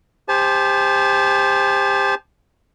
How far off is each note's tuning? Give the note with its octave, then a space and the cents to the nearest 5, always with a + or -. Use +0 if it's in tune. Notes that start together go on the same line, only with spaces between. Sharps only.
G4 +30 C5 +0 A5 -35